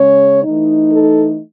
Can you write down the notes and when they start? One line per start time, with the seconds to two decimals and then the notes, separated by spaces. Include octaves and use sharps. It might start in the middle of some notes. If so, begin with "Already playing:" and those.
Already playing: C#3 G#3 C#4 C#5
0.43 E3 A3 D#4
0.92 A4